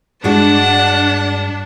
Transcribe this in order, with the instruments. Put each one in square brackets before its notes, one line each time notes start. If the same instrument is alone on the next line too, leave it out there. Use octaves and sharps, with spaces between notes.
[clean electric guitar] G2 [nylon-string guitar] G#3 F#4 [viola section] D4 [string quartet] F#5 A5